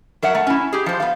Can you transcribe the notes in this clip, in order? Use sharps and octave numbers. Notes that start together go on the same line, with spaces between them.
F#3 A#4 E5 F#5
A3
C#4 E4
G4 G#4
F3 C5
B3 F5